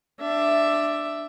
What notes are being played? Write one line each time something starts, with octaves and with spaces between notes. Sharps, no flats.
D4 E5